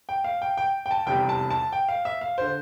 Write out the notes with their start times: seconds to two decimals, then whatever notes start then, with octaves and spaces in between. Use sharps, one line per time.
0.09 G5
0.24 F5
0.42 G5
0.57 G5
0.86 G5
0.91 A5
1.06 F1 E2 C3 G3 G5
1.29 A5
1.50 A5
1.73 G5
1.88 F5
2.05 E5
2.21 F5
2.38 D3 C5